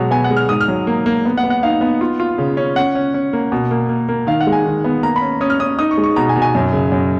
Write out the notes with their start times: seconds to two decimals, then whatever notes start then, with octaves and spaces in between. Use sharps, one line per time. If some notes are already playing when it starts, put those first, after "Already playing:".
Already playing: B2 F#3 G#3
0.11 B3 G#5
0.24 F#5
0.30 G#3
0.36 F6
0.49 G#2 D#6
0.61 F6
0.68 F#3
0.87 A#3
1.06 A#3
1.25 B3
1.38 F#5
1.43 B3
1.50 F#5
1.63 D#4 F5
1.81 B3
2.01 F4
2.20 F4
2.38 C#3
2.57 C#4
2.76 C#4 F#5
2.95 C#4
3.14 C#4
3.33 A#3
3.52 B2
3.71 A#3
3.89 A#3
4.09 A#3
4.27 D#3 F5
4.41 F#5
4.47 G#3
4.52 G#5
4.65 D#3
4.84 B3
5.03 A#3 A#5
5.16 B5
5.22 C#4
5.41 C#4 D#6
5.50 F6
5.60 C#4 D#6
5.79 D#4 D#6
5.91 C#6
5.98 G#3
6.03 C#6
6.16 B2 A#5
6.29 G#5
6.36 B2
6.42 G#5
6.55 F#2
6.73 C#3
6.91 F#2